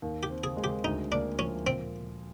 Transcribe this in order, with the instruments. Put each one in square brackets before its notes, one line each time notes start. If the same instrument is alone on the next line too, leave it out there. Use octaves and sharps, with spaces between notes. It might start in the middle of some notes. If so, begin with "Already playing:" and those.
[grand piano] D#2
[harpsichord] G4
[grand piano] C4
[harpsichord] G#4
[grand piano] G#3
[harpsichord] G4
[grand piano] D2 [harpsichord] D#4
[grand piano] A#3 [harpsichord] D4
[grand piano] F3 [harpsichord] C#4
[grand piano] A#2 [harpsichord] C4